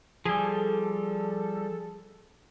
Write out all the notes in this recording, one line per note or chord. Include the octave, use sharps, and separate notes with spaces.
F3 G3 G#4 A4